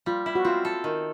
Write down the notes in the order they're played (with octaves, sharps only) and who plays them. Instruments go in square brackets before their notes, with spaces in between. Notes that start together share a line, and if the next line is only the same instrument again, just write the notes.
[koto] G3 [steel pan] F4
[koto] E4
[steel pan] F#4
[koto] C4 [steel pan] F4
[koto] A4
D#3